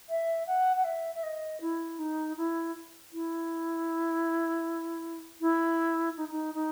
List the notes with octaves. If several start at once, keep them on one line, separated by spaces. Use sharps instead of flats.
E5
F#5
F#5
E5
E5
D#5
E4
D#4
E4
E4
E4
D#4
D#4
D#4